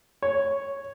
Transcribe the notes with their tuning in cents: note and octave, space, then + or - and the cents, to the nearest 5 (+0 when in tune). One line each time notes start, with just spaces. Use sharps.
C#5 -5